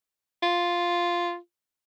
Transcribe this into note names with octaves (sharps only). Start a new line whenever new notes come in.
F4